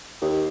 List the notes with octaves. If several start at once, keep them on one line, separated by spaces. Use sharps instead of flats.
D#2